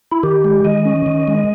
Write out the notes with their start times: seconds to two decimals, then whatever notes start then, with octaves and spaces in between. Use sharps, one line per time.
0.12 E4
0.23 D#3 G4
0.44 G#3
0.65 D#3 D#5
0.85 C#4
1.06 D#3
1.28 G#3